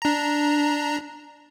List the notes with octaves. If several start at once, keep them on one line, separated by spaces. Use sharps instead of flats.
D4 A#5